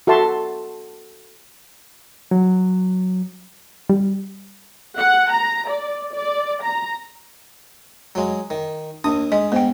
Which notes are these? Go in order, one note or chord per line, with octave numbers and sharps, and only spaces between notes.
F#4 A4 E5 A5 C6
F#3
G3
F#5
A#5
D5
D5
A#5
F#3 G#3
D#3
D#2 D4 D#6
G#3 D#5
G#2 B3 G5